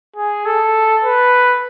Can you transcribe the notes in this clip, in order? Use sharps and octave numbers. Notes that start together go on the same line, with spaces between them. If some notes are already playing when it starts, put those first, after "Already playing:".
G#4
A4
B4